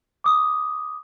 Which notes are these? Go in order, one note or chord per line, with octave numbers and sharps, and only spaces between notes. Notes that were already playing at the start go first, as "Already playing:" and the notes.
D6 D#6